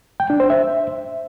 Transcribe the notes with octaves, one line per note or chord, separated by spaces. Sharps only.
G5
D4
C5
E5